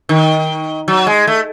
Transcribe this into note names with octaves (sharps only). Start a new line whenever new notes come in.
D#3
F#3
G#3
A3